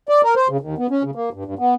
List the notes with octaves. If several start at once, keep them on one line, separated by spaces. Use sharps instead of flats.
D5
A#4
C5
C#3
D#2
B3
C#4
C#3
A#3
G2
G2
B3